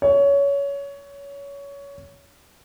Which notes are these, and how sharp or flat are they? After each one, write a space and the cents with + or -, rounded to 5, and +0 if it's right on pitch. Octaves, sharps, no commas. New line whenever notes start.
C#5 +20